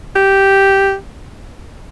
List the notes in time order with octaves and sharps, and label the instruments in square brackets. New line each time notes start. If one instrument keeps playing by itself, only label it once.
[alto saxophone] G4